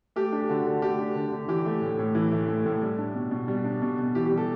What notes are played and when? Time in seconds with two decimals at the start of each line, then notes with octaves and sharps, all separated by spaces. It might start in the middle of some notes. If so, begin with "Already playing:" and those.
0.16 A3 G4
0.32 D4
0.41 G4
0.49 D3 F#4
0.66 D3
0.82 A3 G4
0.99 D4
1.15 D3
1.32 D3
1.48 E3 G4
1.66 A3
1.82 A2
1.99 A2
2.15 E3
2.32 A3
2.48 A2
2.66 A2
2.82 G3
2.98 D4
3.15 B2
3.31 B2
3.48 G3
3.64 D4
3.82 B2
3.98 B2
4.15 E3 G4
4.26 G3 G4
4.37 A4